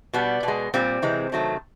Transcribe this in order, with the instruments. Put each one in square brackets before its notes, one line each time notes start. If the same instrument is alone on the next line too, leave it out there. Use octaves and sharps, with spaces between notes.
[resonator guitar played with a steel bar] B2 G3 B3
B2 G#3
A#2 G3 C4
C3 E3 G#3
C3 D#3 F#3 A3